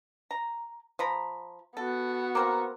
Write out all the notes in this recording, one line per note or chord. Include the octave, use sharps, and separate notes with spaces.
A#5
F3 A#5 B5
B3 F#4 A4
A#3 C4 A#4